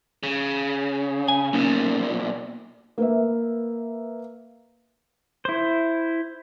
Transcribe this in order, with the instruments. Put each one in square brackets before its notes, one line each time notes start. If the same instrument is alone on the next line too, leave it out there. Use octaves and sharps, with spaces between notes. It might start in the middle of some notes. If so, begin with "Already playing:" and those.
[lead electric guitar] C#3
[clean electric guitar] G#5
[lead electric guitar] B1 A#2 [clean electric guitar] A#3 C#4 D#4
[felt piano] A#3 B4 E5
[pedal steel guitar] E4 C5